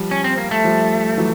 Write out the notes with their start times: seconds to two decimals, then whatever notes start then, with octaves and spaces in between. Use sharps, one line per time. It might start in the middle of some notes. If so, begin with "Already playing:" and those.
Already playing: F3 G3
0.11 C#4
0.24 C4
0.38 A#3
0.51 A3
0.64 F3 G3
1.17 E3 F#3